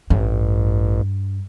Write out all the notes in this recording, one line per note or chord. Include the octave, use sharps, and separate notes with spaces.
A1 G2